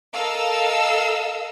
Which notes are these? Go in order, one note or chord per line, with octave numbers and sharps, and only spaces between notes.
A4 A#4 D#5 F5 E6